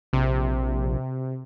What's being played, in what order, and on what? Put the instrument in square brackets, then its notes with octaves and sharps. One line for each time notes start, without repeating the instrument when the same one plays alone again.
[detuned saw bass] A#1 [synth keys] C3